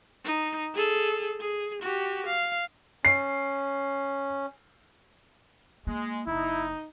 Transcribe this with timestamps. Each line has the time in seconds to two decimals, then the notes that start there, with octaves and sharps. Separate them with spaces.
0.25 D#4
0.74 G#4 A4
1.40 G#4
1.83 F#4 G4
2.27 F5
3.05 C#4 C7
5.87 G#3 A#3
6.27 F#1 D#4 E4